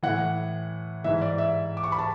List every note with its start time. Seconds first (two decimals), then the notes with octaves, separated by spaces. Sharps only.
0.03 A2 E3 F#5
1.04 E3 E5
1.07 G#2
1.21 D5
1.38 E5
1.77 D6
1.83 C#6
1.92 B5
1.99 A5